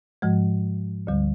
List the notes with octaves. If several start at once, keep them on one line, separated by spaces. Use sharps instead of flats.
G#2 F3 G#3
D2 D3 G3